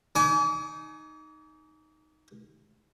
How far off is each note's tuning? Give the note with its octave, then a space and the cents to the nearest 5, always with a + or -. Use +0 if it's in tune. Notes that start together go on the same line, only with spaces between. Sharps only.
D#4 +0 G#5 +25 D6 -40